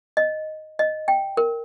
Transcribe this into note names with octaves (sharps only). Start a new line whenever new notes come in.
D#5
D#5
G5
A#4